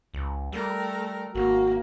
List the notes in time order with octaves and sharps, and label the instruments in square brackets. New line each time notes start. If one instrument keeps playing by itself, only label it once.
[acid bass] C#2
[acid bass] G3 [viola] A3 A#4
[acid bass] G#1 [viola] A#3 [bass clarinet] F#4